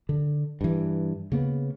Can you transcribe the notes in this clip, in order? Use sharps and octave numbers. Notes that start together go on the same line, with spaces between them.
D3
G2 E3
C#3 A#3 B3